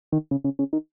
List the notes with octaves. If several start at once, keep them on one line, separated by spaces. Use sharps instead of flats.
D#3
C#3
C#3
C#3
D#3